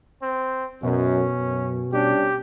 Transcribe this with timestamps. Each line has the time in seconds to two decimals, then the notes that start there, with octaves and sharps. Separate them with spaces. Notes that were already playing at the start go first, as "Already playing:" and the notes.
0.22 C4
0.83 F#2 B2 C#4
1.37 F#2
1.93 G3 C#4 D4 G4